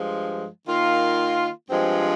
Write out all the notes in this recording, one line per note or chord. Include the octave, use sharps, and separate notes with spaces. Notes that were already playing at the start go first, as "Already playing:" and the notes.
Already playing: G2 F3 G#3
D#3 A#3 F4
G2 F3 G#3 C4